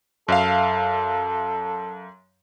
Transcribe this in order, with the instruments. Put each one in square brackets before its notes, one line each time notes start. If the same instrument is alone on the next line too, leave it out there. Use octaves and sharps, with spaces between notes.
[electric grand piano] F#2 E5 F5 [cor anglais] A4